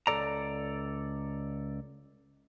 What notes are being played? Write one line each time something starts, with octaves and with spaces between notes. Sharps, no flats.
C#2 C3 A4 D5 A#5